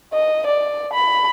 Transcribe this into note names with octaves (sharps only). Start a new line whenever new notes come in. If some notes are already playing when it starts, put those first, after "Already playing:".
D#5
D5
B5